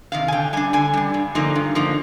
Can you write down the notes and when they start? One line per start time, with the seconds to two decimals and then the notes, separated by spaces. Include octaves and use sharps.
0.12 C3 D#3 F5
0.28 G#5
0.32 D3 G5
0.53 G3 D4 G#5
0.73 D3 G#5
0.94 G3 D4
1.14 G2
1.35 D3 F3 A#3 D#4
1.55 G2
1.75 D3 F3 A#3 D#4